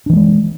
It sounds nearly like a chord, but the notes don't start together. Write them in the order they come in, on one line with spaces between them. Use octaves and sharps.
D4 E3 A3 G#3